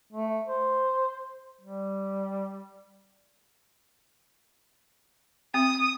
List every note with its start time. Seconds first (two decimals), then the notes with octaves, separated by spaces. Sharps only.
0.13 A3
0.46 C5
1.61 G3
5.54 C4 D#6